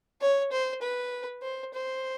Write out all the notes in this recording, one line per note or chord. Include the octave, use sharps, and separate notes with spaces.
C#5
C5
B4
C5
C5